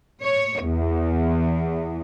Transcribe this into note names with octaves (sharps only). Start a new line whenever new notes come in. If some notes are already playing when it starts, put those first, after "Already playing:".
C#5
E2